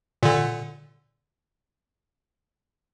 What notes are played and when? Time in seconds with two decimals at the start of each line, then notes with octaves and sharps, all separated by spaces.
0.23 A#2 D3